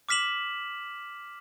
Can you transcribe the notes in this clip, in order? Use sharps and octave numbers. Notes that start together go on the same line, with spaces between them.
D6 F6 B6 E7 F#7